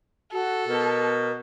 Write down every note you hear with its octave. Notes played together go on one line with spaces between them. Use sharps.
F#4 A4
B2 A#4